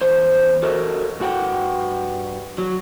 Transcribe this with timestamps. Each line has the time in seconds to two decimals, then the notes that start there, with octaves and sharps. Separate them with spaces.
0.01 E2 C5
0.63 F#4 A4 A#4 C#5 D#5
1.20 G2 F#4 F#5 G5
2.58 F#3